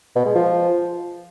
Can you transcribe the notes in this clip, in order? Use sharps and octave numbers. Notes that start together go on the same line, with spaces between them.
B2
G#3
F3